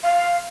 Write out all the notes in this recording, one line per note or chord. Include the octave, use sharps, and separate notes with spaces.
F5